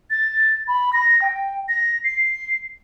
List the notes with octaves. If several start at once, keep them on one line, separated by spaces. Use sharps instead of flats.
A6
B5
A#6
G5
A#6
C7